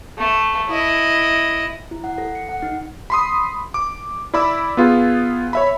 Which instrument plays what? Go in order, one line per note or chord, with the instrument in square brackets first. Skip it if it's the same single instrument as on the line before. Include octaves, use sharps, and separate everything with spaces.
[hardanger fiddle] A3
E4 D#5
[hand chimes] E4
F#5
A4
C#7
F#5
D#4
[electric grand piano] B5 C6 D#6
D6
E4 D5 B5 D6 E6
B3 F4 G#4
C#5 E5 B5